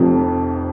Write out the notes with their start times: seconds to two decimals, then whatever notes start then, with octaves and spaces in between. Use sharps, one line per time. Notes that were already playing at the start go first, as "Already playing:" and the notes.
Already playing: F1 F2 C3 F3